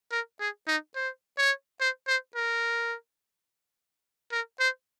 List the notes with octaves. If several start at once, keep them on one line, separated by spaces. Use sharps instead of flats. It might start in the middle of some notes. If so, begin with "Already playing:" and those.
A#4
G#4
D#4
C5
C#5
C5
C5
A#4
A#4
C5